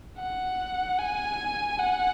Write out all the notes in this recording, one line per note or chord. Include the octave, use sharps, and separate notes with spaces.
F#5
G#5
F#5